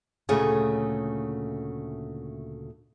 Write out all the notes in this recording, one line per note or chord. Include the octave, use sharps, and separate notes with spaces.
D2 A#2 C#3 A3 G#4 C#5